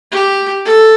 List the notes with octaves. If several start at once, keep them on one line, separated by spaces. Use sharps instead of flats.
G4
A4